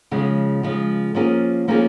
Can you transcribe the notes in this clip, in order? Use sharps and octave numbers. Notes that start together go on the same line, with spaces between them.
C#3 F3 G#3
C#3 F3 G#3
F3 A#3 C#4 F4 G#4
F3 A#3 C#4 F4 G#4